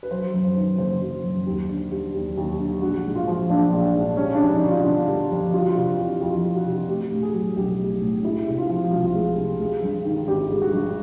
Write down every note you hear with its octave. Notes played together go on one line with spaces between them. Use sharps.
B4
F#3 C5
F#2
C5
D#3
F#1 C5
F#3
F#2
D#2
D3
G3
D#2
D#2
D3
A#1 F#4
G#2
F4
F3
A#1 D4
A#1
G#2
G3 C#4
D4
F2
D#4
D3
F4
G1
G3
F2
G3 F4
F#4
F4
C3
E3
F2 F4
G3
F#4
C3
A3 G4
A2
G#4
F#3
B1 G4
A3
A2
G#3 E4
C3
F4
F3
C2 F4
G#3
C3
G#3
G2
D#3
G#1 G4
G#3
F#4
G2